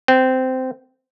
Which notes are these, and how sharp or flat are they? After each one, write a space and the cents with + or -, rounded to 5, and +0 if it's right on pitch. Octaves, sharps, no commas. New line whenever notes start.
C4 -15